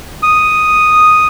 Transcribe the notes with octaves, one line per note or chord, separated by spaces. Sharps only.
D#6